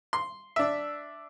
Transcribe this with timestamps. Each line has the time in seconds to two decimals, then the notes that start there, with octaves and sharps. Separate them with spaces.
0.13 C6
0.56 D4 E5